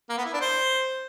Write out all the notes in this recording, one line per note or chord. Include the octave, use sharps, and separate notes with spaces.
A#3
B3
E4
D4
C5